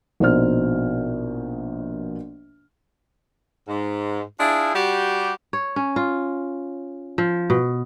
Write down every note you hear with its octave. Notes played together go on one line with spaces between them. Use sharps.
A#1 B2 D#4 C5 F6
G#2
D4 E4 F4 G#4
G3 F#4 G4
C#5
C#4
F4
F3
B2